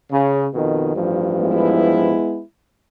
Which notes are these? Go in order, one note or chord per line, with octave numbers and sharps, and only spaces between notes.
C#3
F2 B2 D#3
A1 G2 F3
G#3 B3 E4